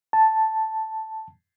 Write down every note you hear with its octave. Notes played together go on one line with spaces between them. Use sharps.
A5